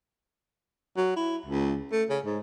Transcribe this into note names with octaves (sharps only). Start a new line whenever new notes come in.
F#3
E4
C#2
A3
C#3
G#2